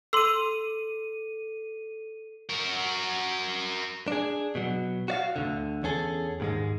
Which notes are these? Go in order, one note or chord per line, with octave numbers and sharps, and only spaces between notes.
A4 C6 E6 D#7
F#4 A#4
D4 G#4
B2 F#3
F#4 D5 F5
D2 A#2 D3
E2 C#4 G#4 A4
D#2 G#2 G#3